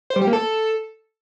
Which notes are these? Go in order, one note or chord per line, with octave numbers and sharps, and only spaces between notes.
C5
G3
G4
A#3
A4